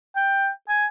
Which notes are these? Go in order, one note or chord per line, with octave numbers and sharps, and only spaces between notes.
G5
G#5